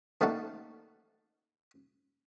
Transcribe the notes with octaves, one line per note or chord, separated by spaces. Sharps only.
D#3 A3 A#3 D4 F#4